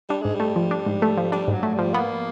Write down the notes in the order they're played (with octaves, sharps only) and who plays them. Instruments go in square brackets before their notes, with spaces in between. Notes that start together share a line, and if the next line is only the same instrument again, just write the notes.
[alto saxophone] G3 [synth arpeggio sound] D4
[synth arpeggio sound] G#2 [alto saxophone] G#3
[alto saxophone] G3 [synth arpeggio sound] A3
[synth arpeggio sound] F3
D4
G#2
A3
F3
[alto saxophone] G3 [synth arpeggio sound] D4
[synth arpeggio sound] G#2 [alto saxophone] F#3
[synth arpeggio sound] A3
[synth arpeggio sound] F3 [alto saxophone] G3
[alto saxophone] A#3 [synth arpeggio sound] B3